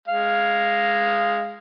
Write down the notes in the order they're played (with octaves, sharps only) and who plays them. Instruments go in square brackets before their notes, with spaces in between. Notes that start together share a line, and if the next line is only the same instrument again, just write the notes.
[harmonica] G#3 F5